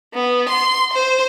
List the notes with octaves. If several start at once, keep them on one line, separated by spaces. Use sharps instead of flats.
B3
C6
C5